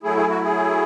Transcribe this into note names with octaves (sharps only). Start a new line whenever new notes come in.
F#3 A3 E4 G#4
G#4
F#4
G#4